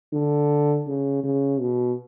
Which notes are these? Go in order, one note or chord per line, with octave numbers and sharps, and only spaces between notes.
D3
C#3
C#3
B2